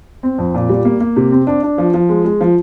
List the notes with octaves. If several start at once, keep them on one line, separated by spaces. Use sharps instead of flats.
C4
F2
A#2
G3
A#3
A#3
C3
C4
D4
D4
F3
F3
G#3
G#3
F3